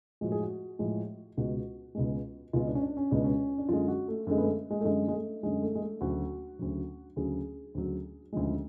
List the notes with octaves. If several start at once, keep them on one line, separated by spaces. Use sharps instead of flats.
A2 F3 G#3 F#4
G#4
F#4
A2 F3 G#3
C#2 B2 G#3 F#4
C#2 B2 G#3
C#2 B2 G#3 F4
D4
C#4
D4
C#4
C#2 B2 G#3 D4
C#4
D4
F#2 D3 G#3 F4
F#4
A3
F#2 D3 G#3 A3
B3
A3
G#3
A3
F#2 D3 G#3
G#3
A3
F#2 D3 G#3
A3
G#3
A3
D2 C#3 F#3 F#4
D2 C#3 F#3
D2 C#3 F#3 G#4
D2 C#3 F#3
D2 C#3 F3 G#3